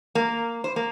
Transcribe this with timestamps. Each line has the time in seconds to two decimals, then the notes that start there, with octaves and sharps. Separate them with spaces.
0.15 A#3
0.64 C5
0.76 A#3